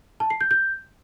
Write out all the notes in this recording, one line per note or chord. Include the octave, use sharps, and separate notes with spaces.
A5
C7
G6
G6